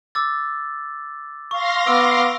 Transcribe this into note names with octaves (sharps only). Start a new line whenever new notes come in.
D6 E6 A6
F5 C6 C#6 A#6
B3 D6 E6 D7